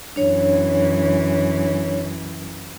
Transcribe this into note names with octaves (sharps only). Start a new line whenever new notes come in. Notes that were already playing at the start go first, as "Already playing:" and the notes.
F#2 E3 D4 C#5